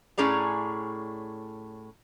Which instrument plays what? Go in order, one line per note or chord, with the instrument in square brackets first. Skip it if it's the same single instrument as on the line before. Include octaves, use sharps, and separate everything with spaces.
[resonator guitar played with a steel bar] A2 C#4 G#4 D5 A#5